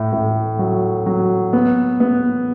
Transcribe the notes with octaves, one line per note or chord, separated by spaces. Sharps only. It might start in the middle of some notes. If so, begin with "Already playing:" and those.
Already playing: A2
A2
F#3
F#3
B3
B3